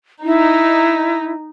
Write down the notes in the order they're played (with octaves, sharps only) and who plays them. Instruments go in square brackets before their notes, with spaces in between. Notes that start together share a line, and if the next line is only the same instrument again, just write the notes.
[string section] D#4 [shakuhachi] E4